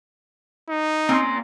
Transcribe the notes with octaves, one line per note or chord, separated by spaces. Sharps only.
D#4
A#3 C4 C#4 G#5 C6